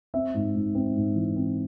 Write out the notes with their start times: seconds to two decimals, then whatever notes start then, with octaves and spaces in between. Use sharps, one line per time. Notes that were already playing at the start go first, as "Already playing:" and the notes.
0.14 C4 E5
0.34 G#2
0.55 G#2
0.75 C4
0.95 G#2
1.16 E3
1.36 C4